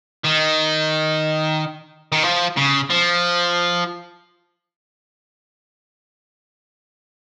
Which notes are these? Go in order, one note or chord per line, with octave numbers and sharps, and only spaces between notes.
D#3
D#3
F3
C#3
F3